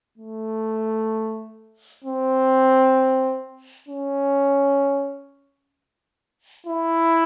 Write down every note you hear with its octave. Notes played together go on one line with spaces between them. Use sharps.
A3
C4
C#4
E4